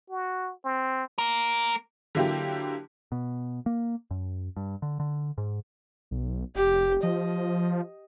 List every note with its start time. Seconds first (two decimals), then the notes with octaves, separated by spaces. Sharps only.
0.10 F#4
0.65 C4
1.18 A#3 A#4
2.15 D3 F#3 A#3 E4 G4
3.12 B2
3.66 A#3
4.11 F#2
4.56 G2
4.82 D3
5.00 D3
5.38 G#2
6.11 B1
6.55 F1 G4
7.03 F3 D#5